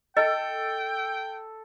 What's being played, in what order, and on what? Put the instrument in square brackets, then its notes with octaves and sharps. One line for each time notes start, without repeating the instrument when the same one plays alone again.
[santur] A4 [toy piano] D#5 [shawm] G5